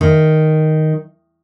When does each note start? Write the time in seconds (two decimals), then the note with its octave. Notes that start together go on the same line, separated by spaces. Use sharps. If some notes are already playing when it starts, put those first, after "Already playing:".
0.01 D#3